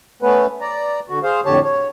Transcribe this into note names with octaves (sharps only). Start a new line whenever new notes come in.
A3 B3 C#4 B4
D5 A#5
D3 F#4
G#4 C5 F5
F2 A2 D3 G4 C#5 A5
C#5